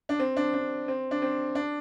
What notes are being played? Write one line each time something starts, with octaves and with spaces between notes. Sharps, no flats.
D4
C4
D4
D4
C4
D4
C4
D4